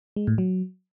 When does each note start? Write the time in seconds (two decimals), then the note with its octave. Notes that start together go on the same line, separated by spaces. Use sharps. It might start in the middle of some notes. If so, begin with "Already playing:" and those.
0.16 G#3
0.27 A2
0.38 F#3